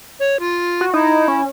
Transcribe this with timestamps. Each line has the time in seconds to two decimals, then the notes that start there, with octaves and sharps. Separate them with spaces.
0.20 C#5
0.40 F4
0.81 F#4
0.94 D#4 E4
1.28 C#4